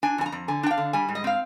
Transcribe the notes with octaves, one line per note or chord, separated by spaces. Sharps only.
D4 G#5
F2 G#5
A#5
F2
D3 G#5
D4 G5
F5
D3
G3 G#5
G#2
D#5
C4 F5